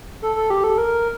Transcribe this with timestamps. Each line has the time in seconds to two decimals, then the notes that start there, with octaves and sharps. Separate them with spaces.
0.22 A4
0.36 A4
0.50 G4
0.64 A4
0.78 A#4